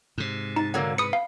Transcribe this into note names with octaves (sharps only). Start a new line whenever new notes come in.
G#2 C3
D#4 A5
D3 F#3 A#3
B4 D#6 C#7
F5